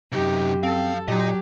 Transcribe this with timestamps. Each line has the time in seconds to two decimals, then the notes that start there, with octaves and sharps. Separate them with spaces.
0.12 F#2 C3 D#4 G4
0.63 F3 C4 A4 F5
1.08 A#2 F#3 G4 D#5 A#5